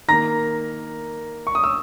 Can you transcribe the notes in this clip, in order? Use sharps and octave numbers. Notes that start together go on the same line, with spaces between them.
D#3 A#3 A#5 A#6
C#6
D#6
E6